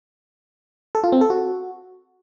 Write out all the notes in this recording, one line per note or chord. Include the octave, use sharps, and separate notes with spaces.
A4
F4
C4
A4
F#4